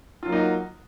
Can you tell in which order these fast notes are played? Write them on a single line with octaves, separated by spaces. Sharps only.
F4 F#3 A#3 D#4 F#4